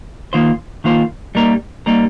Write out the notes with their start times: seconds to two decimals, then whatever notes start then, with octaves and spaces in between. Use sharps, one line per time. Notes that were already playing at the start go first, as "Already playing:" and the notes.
0.33 D#3 A#3 F4 C5
0.84 D#3 A#3 F4 C5
1.35 G3 A#3 D#4 A#4
1.86 G3 A#3 D#4 A#4